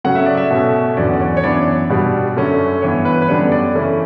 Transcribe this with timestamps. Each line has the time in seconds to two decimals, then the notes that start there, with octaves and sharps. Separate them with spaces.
0.04 C#3 F#3 A3 C#4 F#5
0.15 E5
0.26 D5
0.37 E5
0.50 B2 A3 C#4
0.97 E2 D3 F#3 C#4 D5
1.14 D5
1.20 C#5
1.37 C#5
1.43 F#2 E3 B3 D4 D5
1.89 B2 G3 B3 D4
2.36 F#2 D3 A3 C#4
2.82 G2 E3 B3 C#5
3.05 B4
3.22 B4
3.28 F#2 D3 G3 B3 D4 C#5
3.52 D5
3.75 C#3 E3 A3 C#4